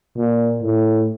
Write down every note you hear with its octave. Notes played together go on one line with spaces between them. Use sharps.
A#2
A2